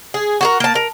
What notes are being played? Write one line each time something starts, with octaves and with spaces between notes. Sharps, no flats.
G#4
F#4 G#4 A#4
A#3 A5
A#4